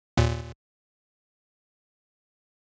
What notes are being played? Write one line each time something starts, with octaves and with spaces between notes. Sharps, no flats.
D#2 A#2